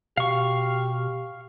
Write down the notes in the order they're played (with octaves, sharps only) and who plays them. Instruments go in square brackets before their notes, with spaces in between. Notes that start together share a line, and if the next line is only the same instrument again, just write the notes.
[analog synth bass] B2 [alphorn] G4 [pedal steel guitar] F5 C#6